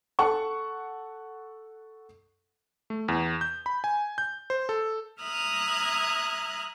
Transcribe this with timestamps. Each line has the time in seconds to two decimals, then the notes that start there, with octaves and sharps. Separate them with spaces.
0.19 A4 F#5 A5 C#6
2.90 A3
3.08 E2
3.41 G6
3.66 B5
3.84 G#5
4.18 G6
4.50 C5
4.69 A4
5.21 E5 A#5 D#6 F6 F#6 G#6